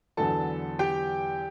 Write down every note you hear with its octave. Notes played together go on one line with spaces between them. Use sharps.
E2 D3 F#3 B3 A4 A5
G4 G5